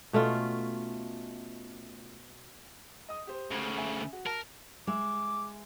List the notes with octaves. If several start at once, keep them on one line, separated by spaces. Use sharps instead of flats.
B2 A3 C#4 F4
D#5 D#6
G4 C5
D2 C#3
E5 G#5
F#4
A#4 A5
G#3 E5 D6